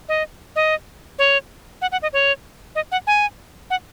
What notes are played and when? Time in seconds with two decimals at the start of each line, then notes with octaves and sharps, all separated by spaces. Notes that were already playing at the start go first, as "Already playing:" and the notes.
0.09 D#5
0.56 D#5
1.19 C#5
1.82 F#5
1.92 F#5
2.02 D#5
2.13 C#5
2.75 D#5
2.92 F#5
3.07 G#5
3.70 F#5